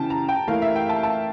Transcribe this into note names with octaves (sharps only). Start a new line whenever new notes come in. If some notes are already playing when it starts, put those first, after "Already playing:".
Already playing: C#3 E3 G5 A5
A#5
G5
E3 A3 E4 A#4 F5
E5
G5
A5
A5